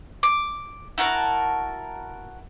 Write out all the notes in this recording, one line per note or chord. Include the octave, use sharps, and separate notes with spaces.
D6
E4 F#4 A#4 A5